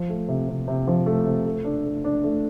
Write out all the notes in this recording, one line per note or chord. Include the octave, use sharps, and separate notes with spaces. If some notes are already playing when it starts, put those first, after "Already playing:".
Already playing: F3
A3
C3
C3
C3
F3
A3
C3
A3
D4
A3
D4
A3